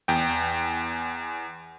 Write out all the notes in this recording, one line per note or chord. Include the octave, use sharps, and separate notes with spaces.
E2 G5